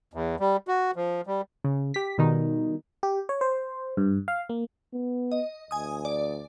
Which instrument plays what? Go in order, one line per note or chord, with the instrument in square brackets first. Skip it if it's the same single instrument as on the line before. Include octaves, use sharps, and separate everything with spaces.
[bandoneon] E2
G3
F#4
F3
G3
[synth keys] C#3
G4 B6
B2 D#3 G3 D#4
[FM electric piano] G4
C#5
C5
G2
F5
A#3
[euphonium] B3
[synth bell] D#5
[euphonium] D2 [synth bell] G#5 D#6
[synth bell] D5